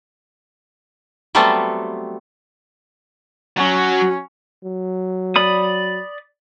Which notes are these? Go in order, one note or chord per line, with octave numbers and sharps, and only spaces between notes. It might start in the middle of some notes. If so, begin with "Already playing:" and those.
F#3 G3 A3 B3 C4 A4
F#3 C#4 F#4
F#3
D5 B5 D#6